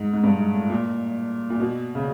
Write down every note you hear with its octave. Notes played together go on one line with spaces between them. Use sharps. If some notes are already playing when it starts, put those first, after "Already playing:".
Already playing: G#2
G#2
G2
G#2
A2
A#2
A#2
B2
C#3